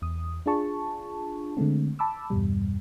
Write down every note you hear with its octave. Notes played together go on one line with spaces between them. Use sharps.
E2 D#6
D4 F4 G#4 A5 C#6
D3 G#3 A3 C4
A5 B5 D6 E6
E2 G2 B2 G3